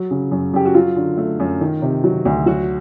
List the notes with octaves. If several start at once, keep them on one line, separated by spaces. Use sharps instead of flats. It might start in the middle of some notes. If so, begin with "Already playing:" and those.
Already playing: F#3
C#3
F#2
F#2 G4
F#4
F#3 F4
D3
A3
F#2
D#3
C3
F#3
D2
F#3 F#4